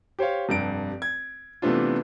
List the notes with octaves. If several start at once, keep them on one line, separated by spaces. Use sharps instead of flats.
G4 C5 C#5 F5
F1 G2 D7
G#6
C3 E3 A3 B3 D4 F4